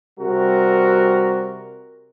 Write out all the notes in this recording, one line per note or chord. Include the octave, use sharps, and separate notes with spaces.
C3 G3 F#4 A#4